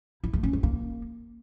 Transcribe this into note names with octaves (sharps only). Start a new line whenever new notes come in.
E4
A3
C#4
G#3
A#3